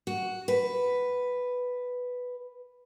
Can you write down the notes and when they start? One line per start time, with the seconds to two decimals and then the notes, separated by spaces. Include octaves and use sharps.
0.07 F#4
0.48 B4